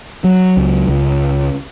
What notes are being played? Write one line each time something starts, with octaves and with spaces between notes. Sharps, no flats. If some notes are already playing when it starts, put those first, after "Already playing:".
F#3
C#2
C#2